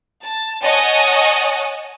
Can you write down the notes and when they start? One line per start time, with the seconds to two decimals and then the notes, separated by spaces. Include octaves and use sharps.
0.23 A5
0.63 C#5 D#5 F#5 G#5 A5